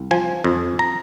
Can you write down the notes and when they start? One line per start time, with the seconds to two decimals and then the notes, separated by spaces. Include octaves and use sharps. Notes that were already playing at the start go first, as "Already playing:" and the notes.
Already playing: C2
0.11 F3 G#5
0.44 F2
0.79 A#5